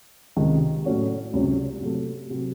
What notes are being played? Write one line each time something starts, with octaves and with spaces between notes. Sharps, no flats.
C#2 C3 D#3 G#3
A2 F#3 A3 C#4 F#4
C#2 C3 F#3 C#4
C3 F#3 A3
C3 F#3